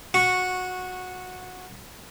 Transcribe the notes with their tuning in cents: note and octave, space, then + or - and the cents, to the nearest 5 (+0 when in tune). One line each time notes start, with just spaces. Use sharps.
F#4 -15 C#6 -5